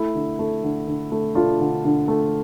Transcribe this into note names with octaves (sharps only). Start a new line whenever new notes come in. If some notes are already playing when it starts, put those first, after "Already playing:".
Already playing: A3 E4
D3
A3
D3
D3
A3
A3 D4 F4
D3
D3
A3